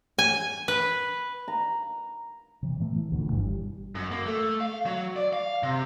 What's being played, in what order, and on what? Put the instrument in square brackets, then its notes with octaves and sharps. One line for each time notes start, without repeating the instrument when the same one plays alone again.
[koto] G#5
B4
[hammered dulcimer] A#5
[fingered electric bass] C3 E3
A2 E3 A3 B3
E3
D2 B2 F3
G1 G2 D3 E3
G3
[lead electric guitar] F#2
A#3
A3
F5
F#3
D5
F5
C3